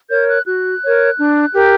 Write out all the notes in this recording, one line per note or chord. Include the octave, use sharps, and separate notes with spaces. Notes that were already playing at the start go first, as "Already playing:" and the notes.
A#4 C#5 G6
F#6
F#4 F#6
A#4 C#5
D4
G4 A#4